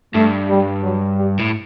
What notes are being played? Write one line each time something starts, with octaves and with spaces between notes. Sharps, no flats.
G2 A3
G3
F#3
G3
A2